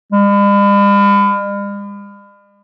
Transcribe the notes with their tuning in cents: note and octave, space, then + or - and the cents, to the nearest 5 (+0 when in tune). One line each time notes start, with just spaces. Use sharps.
G3 +45